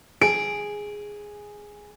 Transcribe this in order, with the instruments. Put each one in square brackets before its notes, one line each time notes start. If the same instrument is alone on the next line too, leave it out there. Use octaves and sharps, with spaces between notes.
[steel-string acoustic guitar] G#4 [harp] D7